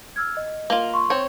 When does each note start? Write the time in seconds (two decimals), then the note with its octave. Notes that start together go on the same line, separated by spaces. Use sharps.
0.16 E6 F6 G#6
0.37 D#5
0.70 A#3 F4
0.93 C6 C#6
1.10 C4 C#5